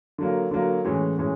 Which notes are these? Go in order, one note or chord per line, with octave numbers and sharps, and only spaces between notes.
D3 F#3 A#3
D3 F#3 A#3
A2 E3 G#3 C#4
A2 E3 G#3 C#4